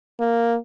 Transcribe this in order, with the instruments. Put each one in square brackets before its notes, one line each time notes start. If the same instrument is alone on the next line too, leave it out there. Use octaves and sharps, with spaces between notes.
[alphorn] A#3